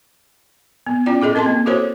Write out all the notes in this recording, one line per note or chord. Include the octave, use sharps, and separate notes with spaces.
B3
C#4 E4 F4 D5 G5
E4 G#4 A4 D#5
C4 A#4 D#5 A5 C6
A#3
E4 F#4 A4 A#4 C5 C#5